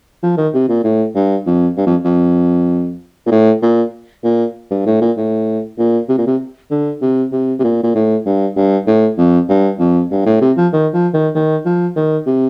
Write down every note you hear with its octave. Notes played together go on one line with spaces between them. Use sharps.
F3
D#3
C3
A#2
A2
G2
F2
G2
F2
F2
A#2
A2
A#2
A#2
G2
A2
A#2
A2
A#2
C3
A#2
C3
D3
C3
C3
C3
A#2
A#2
A2
G2
G2
A2
F2
G2
F2
G2
A2
C3
F3
D#3
F3
D#3
D#3
F3
D#3
C3